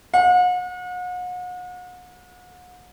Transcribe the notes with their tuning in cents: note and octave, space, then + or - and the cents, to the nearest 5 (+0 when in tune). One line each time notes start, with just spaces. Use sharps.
F#5 -40